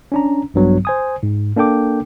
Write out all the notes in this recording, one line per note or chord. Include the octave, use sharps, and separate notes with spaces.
C#4 D4 A#5
A#1 G2 F#3 B3
C5 G#5 D#6
G#2
A#3 D4 A4 G5 D6